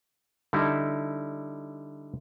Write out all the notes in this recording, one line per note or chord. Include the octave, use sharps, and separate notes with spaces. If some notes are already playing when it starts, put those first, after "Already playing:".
D3 G3 D#4 E4